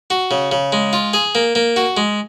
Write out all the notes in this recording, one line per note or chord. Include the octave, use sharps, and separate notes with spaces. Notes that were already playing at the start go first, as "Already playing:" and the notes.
F#4
C#3
C#3
G#3
F4
G#4
A#3
A#3
F#4
G#3